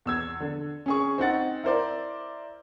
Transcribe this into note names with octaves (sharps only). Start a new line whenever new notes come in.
E2 E6 G#6
D3
C#4 G#4 C#6
C4 D#4 F#5 A6
E4 A#4 C5 D5